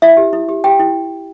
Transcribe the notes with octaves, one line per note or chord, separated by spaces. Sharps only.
E4 E5
G4
E4
G4
G4 G5
E4